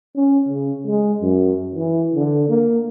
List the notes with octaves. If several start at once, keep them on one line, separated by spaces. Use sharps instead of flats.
C#4
C#3
G#3
F#2
E3
D3
A#3